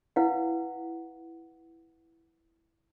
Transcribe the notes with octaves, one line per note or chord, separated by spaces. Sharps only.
E4 B4 F5 F#5